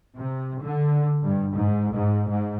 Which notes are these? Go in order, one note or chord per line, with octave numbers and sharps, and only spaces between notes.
C3
D3
G2
G#2
G#2
G#2